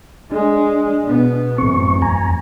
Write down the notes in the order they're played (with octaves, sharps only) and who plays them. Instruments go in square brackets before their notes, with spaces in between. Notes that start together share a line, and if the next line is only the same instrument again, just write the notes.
[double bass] G#3 [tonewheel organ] D4
[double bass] B2 B3
[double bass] A1 F#2 [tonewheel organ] C4 C#6
[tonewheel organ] F2 G#5 A#5